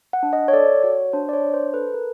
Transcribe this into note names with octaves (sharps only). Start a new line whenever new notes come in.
F#5
D4
D#5
C#5
A4 D5
F#4 C#5
D4 C5
D5
C#5
D4
C5
A4 B4
A#4